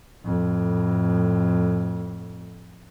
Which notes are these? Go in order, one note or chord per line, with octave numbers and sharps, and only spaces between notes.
F2 A2